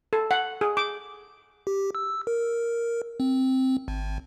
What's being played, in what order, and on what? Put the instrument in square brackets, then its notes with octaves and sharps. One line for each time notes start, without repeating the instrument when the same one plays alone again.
[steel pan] A4
F#5
G#4
D6
[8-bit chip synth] G4
E6
A#4
C4
G#1